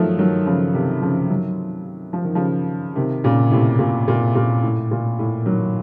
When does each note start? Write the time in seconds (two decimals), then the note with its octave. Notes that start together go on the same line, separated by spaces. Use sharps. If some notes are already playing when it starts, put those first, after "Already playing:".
Already playing: D#3 F3 F#3 A3
0.18 D#3 F#3
0.45 C#3 F3
0.74 C3 D#3
1.01 C#3 F3
1.29 D#3 F#3
2.13 F3
2.24 D#3
2.35 C#3 F3
2.95 C3 D#3
3.24 A#2 C#3
3.51 A2 C3
3.79 A#2
4.08 A#2
4.35 A#2
4.63 A2
4.91 A#2
5.19 A2
5.45 D#3 F#3